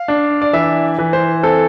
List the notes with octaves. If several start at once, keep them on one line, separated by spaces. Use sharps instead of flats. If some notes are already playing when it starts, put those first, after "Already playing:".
Already playing: F5
D4
D5
E3 E5
E3
C5
C4 A4